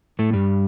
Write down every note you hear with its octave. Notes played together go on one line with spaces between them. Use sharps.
A2 A3
G2 G3